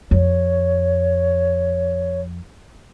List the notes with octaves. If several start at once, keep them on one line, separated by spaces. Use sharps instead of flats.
F2 C#5